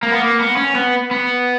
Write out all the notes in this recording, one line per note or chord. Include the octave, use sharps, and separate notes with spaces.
A#3
B3
A#3
B3
C#4
B3
B3